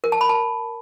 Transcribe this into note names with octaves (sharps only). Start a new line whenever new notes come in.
A#4
A5
B5
A5